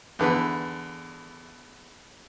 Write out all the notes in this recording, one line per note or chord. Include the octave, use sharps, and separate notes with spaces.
E2 D3 B4